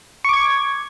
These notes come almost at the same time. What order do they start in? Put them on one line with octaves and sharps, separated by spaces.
C#6 D6 G#6